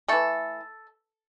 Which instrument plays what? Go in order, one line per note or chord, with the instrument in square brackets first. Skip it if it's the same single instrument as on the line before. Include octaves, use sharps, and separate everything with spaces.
[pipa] E3 A3 A4